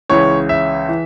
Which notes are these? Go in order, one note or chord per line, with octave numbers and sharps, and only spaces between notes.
C#2 C#3 E3 C#5
E5
E3